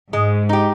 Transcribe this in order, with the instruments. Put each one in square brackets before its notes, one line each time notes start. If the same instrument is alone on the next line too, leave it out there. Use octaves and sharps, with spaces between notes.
[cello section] G#2 [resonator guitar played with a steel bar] G#3
[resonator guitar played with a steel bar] D#4 G4